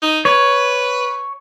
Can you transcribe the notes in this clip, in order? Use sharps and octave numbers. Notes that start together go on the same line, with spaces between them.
D#4
B4 C#5